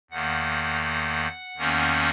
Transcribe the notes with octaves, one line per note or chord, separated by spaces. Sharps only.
E2 D#3 A#3 F#5
F#5
E2 D#3 A#3 C#4